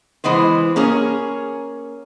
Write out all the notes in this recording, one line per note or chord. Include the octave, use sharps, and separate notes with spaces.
E3 G#3 B3 C5
A#3 C#4 G#4 C#5